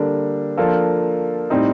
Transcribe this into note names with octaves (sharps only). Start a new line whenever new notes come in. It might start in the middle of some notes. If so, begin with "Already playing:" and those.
Already playing: D3 G3 A#3 D4 A4
F3 A#3 D4 F4 A4
A2 G3 C4 D#4